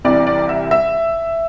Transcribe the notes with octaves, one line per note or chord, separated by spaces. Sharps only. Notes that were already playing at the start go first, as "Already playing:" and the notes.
C2 C3 E3 G3 D5
D5
E5
E5